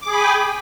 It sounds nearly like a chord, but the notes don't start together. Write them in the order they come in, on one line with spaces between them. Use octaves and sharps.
D6 G#4 B5 G#5 G5